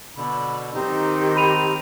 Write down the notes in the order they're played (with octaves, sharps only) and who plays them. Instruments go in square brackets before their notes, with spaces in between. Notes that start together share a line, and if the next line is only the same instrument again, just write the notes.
[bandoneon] B2 D3 [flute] B5
[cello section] D#3 [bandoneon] C4 D#4 [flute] G4
[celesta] B5 D#7 F7